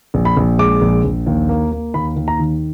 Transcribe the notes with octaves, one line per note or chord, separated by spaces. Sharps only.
A#1
B5
A#1
G#3 D6
A#1
A#1
D#2
A#3
A#3
D#2 B5
D#2
A#5
D#3